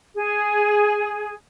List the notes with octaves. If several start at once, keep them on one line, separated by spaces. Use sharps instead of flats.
G#4